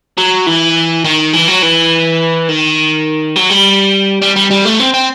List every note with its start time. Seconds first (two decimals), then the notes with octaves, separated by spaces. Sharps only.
0.17 F#3
0.47 E3
1.05 D#3
1.33 E3
1.48 F#3
1.62 E3
2.49 D#3
3.36 F#3
3.50 G3
4.22 G3
4.36 G3
4.51 G3
4.65 A3
4.80 C4
4.94 C4